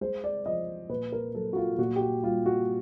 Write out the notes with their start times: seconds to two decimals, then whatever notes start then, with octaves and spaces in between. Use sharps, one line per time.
0.01 G#3 C5
0.24 D5
0.46 F3 D#5
0.89 A#2 B4
1.12 A#4
1.35 F#3 A4
1.53 F#4
1.56 F4
1.78 A#2 F#4
1.96 G4
2.01 F#4
2.23 G3 F4
2.46 F#4